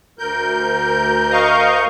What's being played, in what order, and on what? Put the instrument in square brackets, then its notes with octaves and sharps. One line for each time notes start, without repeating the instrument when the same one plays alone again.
[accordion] D2 A#4 G6
[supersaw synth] D#5 F5 C#6